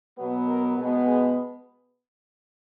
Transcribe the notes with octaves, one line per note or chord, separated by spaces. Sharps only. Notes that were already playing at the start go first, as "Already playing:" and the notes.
B2 F#3 B3
A#4
B2 G#3 B3
G#4